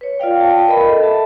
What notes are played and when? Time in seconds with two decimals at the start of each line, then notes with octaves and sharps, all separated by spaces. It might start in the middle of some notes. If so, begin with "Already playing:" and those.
0.01 B4 C#5
0.19 F4 D5 F5 G5
0.41 G5 A5
0.68 A#4 B4 D#5 B5
0.88 A4
1.02 E5 A5